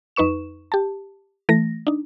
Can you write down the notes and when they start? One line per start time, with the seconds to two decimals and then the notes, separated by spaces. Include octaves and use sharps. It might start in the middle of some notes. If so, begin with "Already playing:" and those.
0.16 F2 D#4 B4 C#6 E7
0.72 G4 A5
1.49 E3 A3 A#6
1.87 D4 D#4